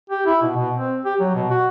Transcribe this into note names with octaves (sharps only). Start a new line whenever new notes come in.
G4
E4
B2
B2
C4
G4
F#3
B2
F#4